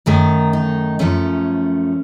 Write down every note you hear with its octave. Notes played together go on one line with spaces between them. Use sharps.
F#2 D#3 A3 A#4
D#4
F#2 F3 A3 C#4